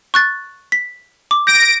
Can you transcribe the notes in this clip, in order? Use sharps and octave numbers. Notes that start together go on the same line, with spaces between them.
C#6 F#6 A6
B6
D6
G6 A#6 D7